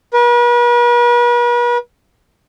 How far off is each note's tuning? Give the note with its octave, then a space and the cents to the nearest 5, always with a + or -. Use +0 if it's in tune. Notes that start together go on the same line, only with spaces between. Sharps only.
B4 -45